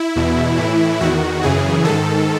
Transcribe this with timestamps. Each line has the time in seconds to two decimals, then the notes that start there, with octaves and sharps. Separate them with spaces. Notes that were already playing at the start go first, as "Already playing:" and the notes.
Already playing: E4
0.16 E2 B2
0.57 A2 E3
1.00 E2 D#3 F#4
1.43 F#2 C#3 E3 G#4
1.84 G#2 D#3 A4